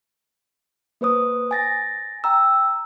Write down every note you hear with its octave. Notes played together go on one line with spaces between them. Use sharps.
A#3 B4 C5 D#6
G#5 A6 A#6
G5 A#5 E6